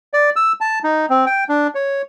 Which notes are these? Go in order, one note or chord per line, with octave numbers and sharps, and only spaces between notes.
D5
E6
A5
D#4
C4
G5
D4
C#5